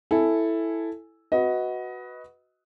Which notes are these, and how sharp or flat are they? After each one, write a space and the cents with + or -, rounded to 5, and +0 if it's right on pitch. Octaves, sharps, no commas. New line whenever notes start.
E4 +0 A4 +0 G#5 +0
F#4 +0 B4 +0 D#5 +20